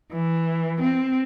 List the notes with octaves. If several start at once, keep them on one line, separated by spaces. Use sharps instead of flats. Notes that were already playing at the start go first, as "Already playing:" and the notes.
E3
C4